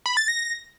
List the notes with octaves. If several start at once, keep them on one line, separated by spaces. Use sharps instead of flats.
B5
A6
A#6